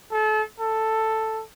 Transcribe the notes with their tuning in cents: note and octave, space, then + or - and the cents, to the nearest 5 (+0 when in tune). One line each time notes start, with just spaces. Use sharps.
A4 -35
A4 +5